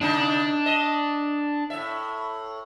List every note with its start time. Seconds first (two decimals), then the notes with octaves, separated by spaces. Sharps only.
0.01 C3 D4 D#4
0.66 D#5
1.70 A2 E5